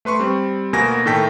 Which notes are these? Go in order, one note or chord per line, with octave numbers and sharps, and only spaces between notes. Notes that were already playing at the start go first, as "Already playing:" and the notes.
A3 B4 C6 C#6
G3 C4
D2 B2 A#3 G#5 A#6
A2 D#3 A3 A4 G5 B6